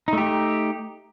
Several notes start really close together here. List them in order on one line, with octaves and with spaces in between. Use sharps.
D#4 A3 G4